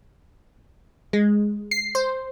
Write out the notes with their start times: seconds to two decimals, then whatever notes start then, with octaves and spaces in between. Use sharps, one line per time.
1.13 G#3
1.71 C7
1.95 C5